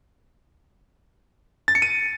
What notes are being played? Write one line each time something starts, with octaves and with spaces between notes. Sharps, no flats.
A6
C#7
D#7